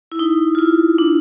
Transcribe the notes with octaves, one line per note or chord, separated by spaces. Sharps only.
E4
D#4
F4
E4
D4